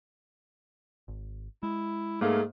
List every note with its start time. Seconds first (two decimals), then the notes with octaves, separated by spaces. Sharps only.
1.08 G#1
1.63 G#3 E4
2.21 G#2 A3 A#3 G#4 F5